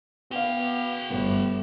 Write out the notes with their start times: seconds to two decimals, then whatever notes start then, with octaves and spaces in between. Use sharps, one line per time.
0.31 B3 F#4 F5 G5 G7
1.10 G1 A3 B3